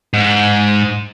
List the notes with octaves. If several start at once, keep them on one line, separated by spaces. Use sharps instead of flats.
G#2